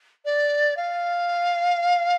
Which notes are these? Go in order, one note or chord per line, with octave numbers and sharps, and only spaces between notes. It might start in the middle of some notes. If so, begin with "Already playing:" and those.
D5
F5